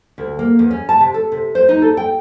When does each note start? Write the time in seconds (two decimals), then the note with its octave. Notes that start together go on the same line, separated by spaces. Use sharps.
0.18 D2
0.39 A#3
0.59 E2
0.71 C#4
0.89 A5
1.01 C3
1.14 A4
1.32 C3
1.55 C5
1.69 D#4
1.82 A4
1.97 G5